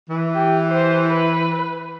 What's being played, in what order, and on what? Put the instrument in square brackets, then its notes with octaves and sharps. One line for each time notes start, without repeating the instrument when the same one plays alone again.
[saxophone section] E3
[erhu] G4
C5
B4